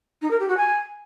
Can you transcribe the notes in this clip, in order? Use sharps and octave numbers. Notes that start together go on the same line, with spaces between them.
D#4
A#4
G4
F#4
G#5